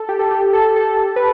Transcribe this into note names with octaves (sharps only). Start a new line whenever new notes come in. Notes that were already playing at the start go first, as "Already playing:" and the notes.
Already playing: A4
G4
A4
G4
A4
A4
B4